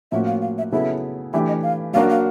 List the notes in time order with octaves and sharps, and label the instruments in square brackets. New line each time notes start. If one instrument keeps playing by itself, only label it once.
[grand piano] A2 F3 A#3 C#4 F#4 [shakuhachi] E5
[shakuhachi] F5
F5
E5
[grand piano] C#3 F#3 B3 E4 A4 [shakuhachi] E5
[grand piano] E3 A3 D4 G4 [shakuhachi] E5
[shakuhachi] D#5
F5
[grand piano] F#3 A#3 D4 F#4 A#4 [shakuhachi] F5
[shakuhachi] F5